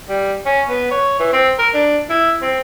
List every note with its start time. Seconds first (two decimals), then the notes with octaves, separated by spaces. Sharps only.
0.09 G3
0.45 C#4
0.69 B3
0.91 C#5
1.20 E3
1.33 C4
1.59 A#4
1.74 D4
2.10 E4
2.42 C4